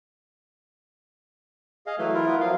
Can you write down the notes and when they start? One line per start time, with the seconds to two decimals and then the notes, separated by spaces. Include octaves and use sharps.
1.87 G#4 D#5 F5
1.99 E3 F#3 A3
2.14 E4 F4 A#4
2.27 B3
2.41 F3 F#3 F4